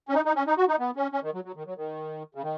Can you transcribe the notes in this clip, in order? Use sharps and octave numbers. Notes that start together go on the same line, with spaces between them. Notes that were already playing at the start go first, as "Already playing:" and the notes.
C#4
D#4
D#4
C#4
D#4
F#4
D#4
B3
C#4
C#4
D#3
F#3
F#3
D#3
F#3
D#3
C#3
D#3